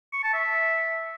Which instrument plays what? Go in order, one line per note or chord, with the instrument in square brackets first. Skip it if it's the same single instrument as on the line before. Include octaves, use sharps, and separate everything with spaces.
[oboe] C#6
A5
E5